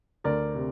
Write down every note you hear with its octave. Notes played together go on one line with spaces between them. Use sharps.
D2 A#4 D5
C3